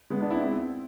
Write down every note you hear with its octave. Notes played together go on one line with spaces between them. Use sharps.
G#3 B3
B3 D4
C4 E4
C4 E4